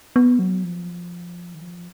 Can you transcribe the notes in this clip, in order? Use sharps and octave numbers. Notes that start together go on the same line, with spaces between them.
B3
F#3
F3
D#3
F3